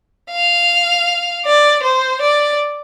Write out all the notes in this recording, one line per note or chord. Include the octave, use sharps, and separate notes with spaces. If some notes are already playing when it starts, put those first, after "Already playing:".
F5
D5
C5
D5